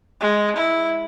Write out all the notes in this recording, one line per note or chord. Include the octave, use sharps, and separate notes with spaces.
G#3
E4